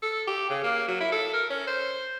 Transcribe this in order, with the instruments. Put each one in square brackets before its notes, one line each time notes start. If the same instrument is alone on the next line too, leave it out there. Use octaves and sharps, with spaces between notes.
[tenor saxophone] A4
G4
C#3
A#3
F#3
E4
A4
A#4
C#4
C5